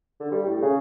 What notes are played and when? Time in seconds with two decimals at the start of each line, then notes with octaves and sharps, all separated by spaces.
0.20 D3
0.32 G3
0.46 A2
0.62 C#3